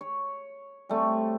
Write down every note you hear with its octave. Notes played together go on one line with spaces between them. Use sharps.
C#5
G3 A3 C4